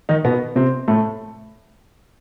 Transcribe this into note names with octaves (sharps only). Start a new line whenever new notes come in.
D#3 D#4
B2 B3
C3 C4
A2 A3